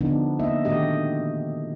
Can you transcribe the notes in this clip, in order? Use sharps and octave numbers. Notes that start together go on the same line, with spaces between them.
D3 F3 B3 D4 D#4
A#3 D#4 D#5 E5
A#2 D#3 A3 F#4 G4 D#5